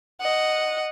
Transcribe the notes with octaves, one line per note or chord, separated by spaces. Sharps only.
D#5 F#5